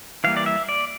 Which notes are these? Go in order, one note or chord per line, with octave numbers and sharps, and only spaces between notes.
E3 G3 A#3 F5
D5
E5
D5